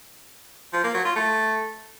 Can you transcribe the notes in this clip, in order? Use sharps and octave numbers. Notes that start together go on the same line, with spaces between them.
F3
A#3
F#3
F4
A3